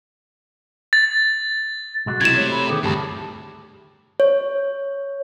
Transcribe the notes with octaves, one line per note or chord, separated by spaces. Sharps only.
A6
B1 G#3 F#4
C3 E4 G#6 E7
A3 C#5
B5
D#3 B3 G4 G#4
D2 G2 G4 A5
C#5